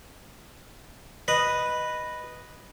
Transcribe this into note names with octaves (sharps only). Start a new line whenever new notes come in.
B4 D#5